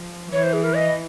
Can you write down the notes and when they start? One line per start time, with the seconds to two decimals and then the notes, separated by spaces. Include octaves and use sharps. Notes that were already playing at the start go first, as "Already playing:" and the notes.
Already playing: F3
0.32 E3 C#5
0.43 C5
0.53 G#4
0.64 A#4
0.74 D#5